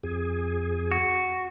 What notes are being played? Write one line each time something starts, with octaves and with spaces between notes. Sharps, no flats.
F2 G#4
F#4